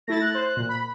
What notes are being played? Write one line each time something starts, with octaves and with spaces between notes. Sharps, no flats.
A3 E4 A6 A#6
F#6
C5
A#2
B5